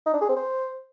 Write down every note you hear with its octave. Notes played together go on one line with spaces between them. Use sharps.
D#4
D4
G#4
C4
C5